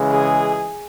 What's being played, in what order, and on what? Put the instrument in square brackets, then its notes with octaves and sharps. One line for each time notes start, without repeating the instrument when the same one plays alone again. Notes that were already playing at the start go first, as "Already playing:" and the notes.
Already playing: [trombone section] C#3 E3 G#3
[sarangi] G#4